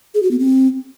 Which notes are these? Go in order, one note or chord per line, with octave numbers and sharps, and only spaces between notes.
G#4
F#4
B3
C4